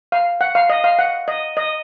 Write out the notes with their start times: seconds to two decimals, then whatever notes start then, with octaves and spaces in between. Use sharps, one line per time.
0.12 F5
0.41 F#5
0.55 F5
0.70 D#5
0.84 F5
0.99 F#5
1.28 D#5
1.57 D#5